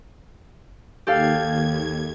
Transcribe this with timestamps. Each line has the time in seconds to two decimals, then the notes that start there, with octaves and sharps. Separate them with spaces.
1.07 D#2 G4 A4 F5 G#6